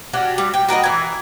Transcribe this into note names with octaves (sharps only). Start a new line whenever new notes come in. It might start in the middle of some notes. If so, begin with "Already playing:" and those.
C#4 D4 F#4 G4
G3
G5
F#4 A#4 B4 D#5
E3 G#5